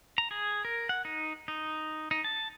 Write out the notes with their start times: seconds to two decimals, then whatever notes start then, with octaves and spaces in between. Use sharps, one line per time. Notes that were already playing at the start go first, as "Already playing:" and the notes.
0.18 A#5
0.31 G#4
0.65 A#4
0.89 F#5
1.05 D#4
1.48 D#4
2.11 D#4
2.24 A5